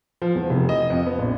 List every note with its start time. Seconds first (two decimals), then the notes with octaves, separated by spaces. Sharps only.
0.22 F3
0.35 E2
0.50 F1
0.69 D#5
0.90 F2
1.07 B3
1.19 A#1